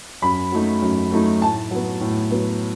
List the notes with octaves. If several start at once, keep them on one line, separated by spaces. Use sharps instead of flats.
F#2 B5
F#3 A3 D#4
F#2
F#3 A3 D#4
A2 A5
F#3 B3
A2
F#3 B3